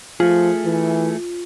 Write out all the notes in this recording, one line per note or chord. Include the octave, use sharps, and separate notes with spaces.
F3 A3 F4 G#4
E3